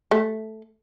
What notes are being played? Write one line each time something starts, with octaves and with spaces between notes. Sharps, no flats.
A3